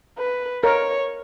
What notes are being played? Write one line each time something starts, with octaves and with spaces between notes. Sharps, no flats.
B4
A#4 C#5